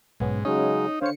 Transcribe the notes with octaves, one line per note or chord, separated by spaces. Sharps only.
B1 G#2 B3 C#4
C#3 F#3 G#3 C#4 D#4
D3 C5 C#5 F5 C#7